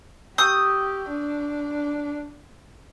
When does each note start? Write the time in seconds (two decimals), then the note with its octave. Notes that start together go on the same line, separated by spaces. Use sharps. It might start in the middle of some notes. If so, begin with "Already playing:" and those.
0.38 G4 C#6 D#6 E6 G6
1.08 D4